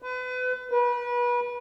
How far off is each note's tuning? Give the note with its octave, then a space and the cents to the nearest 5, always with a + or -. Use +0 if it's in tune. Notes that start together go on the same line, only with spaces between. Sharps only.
B4 +35
B4 -30